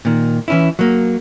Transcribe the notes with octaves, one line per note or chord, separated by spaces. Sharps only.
A#2 D#3
E3 C#4 E4
F#3 A#3